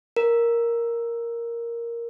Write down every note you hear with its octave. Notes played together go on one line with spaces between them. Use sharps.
A#4